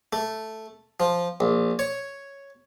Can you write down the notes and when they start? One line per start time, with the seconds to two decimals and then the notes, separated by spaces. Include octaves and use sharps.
0.13 A3
1.00 F3
1.40 A#1
1.79 C#5